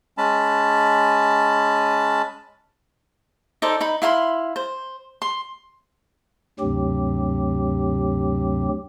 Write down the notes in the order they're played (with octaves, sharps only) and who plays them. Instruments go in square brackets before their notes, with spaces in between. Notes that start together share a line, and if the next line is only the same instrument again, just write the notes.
[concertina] G#3 C#4 A5 B5
[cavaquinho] D#4 A4 C5 D5
D#4 B5
E4 F5 B5 C6
C5
C6
[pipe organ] D2 G2 C3 F#3 C4 G4